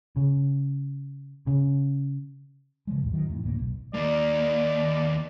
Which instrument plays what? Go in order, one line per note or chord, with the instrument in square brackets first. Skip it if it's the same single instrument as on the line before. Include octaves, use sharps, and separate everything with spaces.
[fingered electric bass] C#3
C#3
[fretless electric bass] C#3 F3 G#3
B1 E2 A2 G#3
G#2 D#3 E3 F#3
F2 A2
F#1 D2 A2 A#3
B1
[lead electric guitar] D#2 A#3 [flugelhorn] D5